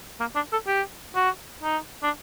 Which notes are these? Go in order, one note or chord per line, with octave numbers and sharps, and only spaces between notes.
A#3
D4
A4
G4
F#4
D#4
D4